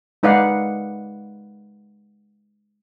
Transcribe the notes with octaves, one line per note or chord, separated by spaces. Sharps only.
G#3 D#4 B4 D5 F5 F#5